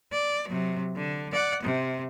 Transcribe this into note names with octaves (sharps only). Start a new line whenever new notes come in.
D5
C3 F#3
D3
D5 F#5
C3